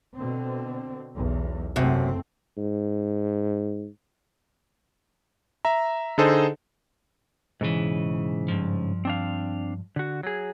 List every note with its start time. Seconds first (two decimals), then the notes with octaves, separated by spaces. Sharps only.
0.16 B2 D3 C4
1.15 B1 E2
1.76 F#1 F#2 C3 A3 C4
2.57 G#2
5.65 E5 A#5
6.18 D3 D#4 G#4 A4 C5 D#5
7.61 B1 G#2 C#3 E3
8.48 G2 F3
9.05 C4 D4 F5
9.96 D3 F#4
10.23 F#3 G#4